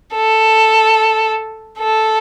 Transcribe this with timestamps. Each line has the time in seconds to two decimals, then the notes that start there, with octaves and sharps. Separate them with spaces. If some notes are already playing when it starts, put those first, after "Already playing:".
0.14 A4
1.79 A4